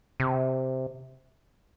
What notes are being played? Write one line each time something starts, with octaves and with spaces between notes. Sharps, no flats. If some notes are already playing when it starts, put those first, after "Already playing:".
C3